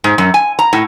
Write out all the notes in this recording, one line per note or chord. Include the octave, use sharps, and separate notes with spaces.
G#2
F#2
G#5
A#5
A2